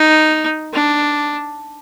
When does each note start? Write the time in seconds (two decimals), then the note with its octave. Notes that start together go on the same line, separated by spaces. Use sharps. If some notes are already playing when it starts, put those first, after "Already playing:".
Already playing: D#4
0.73 D4